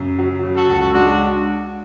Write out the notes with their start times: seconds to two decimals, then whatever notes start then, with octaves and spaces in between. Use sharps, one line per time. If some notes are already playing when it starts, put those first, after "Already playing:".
Already playing: F#2 C#3
0.18 F#3
0.43 C#3
0.56 F#4 A4
0.69 C#2
0.94 G#3 D4 F#4